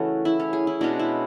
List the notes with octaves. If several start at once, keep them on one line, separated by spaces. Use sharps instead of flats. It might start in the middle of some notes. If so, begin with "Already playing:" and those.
Already playing: C#3 E3 A3 C#4 F#4 A4
E4
C#4
G#4
E4
B2 G#3 C#4 D4
E4